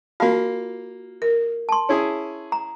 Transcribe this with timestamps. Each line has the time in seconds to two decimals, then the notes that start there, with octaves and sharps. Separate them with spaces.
0.20 A#3 F4 F#4 F5 A5
1.22 A#4
1.69 A5 C6
1.89 C#4 E4 G#4
2.52 A#5